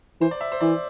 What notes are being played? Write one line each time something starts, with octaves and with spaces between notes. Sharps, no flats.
E3 C5
D5
E5
C5
E3 D5